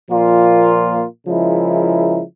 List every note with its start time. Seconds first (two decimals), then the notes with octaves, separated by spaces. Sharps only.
0.10 A#2 F3 A#3 F4
1.27 C#3 F3 G#3 E4 A#4